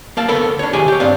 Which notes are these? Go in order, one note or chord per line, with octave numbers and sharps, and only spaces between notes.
A#3 F5 A5
D2 B3 A4 A#4 C#5 B5
D4 C#5
C2 D#3 G4 G#4 G#5
G4 C#5
G2 C4 D4 F5